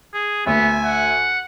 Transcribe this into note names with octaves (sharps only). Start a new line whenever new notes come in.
G#4
D2 B3 E5 G#5
F#5